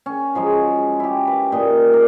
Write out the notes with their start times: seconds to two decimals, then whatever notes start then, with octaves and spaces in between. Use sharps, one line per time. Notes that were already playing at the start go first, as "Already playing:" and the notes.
0.06 C#4
0.35 F3 F#3 G#3
1.00 E4 G4
1.27 B4
1.52 A#2 D#5
1.93 A#4 D5